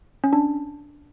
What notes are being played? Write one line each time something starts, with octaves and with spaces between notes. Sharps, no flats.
C#4
D4